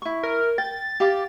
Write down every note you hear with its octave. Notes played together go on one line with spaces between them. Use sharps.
E4 C#6
A#4
G5 A6
G4 F5 D6